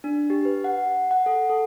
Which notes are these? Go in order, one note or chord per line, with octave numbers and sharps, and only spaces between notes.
D4
G4
B4
F#5
F#5
A4
A4